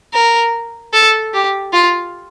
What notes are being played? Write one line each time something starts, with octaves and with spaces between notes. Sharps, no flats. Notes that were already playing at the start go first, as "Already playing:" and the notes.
A#4
A4
G4
F4